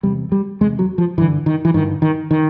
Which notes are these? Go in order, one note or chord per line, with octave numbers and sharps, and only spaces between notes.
E2 C3 G3
G3
E2 C3 G#3
F#3
F3
G2 D3 E3
D#3
E3
G2 D3 D#3
D#3
D#3